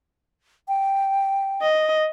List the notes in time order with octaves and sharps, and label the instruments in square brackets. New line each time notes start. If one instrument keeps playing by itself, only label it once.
[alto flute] G5
[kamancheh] D#5